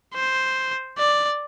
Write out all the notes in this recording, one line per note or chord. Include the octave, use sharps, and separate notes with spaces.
C5
D5